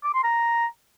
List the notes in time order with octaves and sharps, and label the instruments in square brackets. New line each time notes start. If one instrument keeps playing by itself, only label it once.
[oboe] D6
C6
A#5